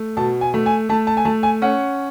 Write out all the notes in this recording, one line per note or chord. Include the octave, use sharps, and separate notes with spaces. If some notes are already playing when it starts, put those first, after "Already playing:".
Already playing: A3
B2 A5
G#5
A3
G#5
A3 A5
A5
G#5
A3 A5
G#5
C#4 F#5